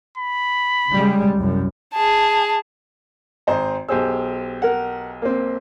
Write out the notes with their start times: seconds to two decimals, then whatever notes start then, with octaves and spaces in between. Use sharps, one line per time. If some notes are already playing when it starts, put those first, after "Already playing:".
0.18 B5
0.91 C#3 G3 G#3
1.36 C2 F#2
1.93 G#4 A5
3.47 G#1 C5 A#5
3.88 B1 G4 G#4 C5 E6
4.62 A#4 F#5
5.22 A#3 C4